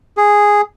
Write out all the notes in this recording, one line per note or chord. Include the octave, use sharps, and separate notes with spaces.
G#4